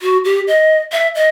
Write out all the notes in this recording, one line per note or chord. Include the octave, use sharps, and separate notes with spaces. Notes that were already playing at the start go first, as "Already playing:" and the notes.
F#4
G4
D#5
E5
D#5